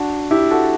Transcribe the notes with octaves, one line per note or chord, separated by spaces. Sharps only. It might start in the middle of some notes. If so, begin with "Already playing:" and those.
Already playing: D4 F#4
E4 G4
F#4 A4